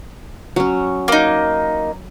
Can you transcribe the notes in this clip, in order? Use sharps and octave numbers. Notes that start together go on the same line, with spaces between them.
F#3 C#4
A#3 D#4